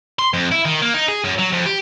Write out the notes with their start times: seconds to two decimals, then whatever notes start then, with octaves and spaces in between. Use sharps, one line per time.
0.19 C6
0.34 F2
0.52 E4
0.65 D#3
0.82 A#3
0.94 D#4
1.08 G#4
1.24 F#2
1.38 F#3
1.52 F2
1.66 G4